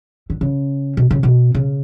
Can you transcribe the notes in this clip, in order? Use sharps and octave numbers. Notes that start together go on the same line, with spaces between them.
D3
C#3
B2
C#3
B2
C#3